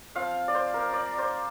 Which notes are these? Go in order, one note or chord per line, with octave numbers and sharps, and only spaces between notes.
F3 C4 F4 F5
D5
C5
A#4
D5
C5